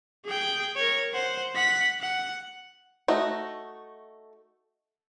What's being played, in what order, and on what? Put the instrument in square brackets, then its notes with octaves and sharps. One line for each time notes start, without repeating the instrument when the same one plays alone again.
[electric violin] G#4 G5
A#4 C#5
C5 F#5
F#5 B6
F#5
[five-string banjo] A3 D#4 F#4